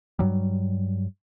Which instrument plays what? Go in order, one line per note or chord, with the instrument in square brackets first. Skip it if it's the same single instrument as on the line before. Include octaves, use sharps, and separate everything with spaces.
[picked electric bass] G2 F#3 G3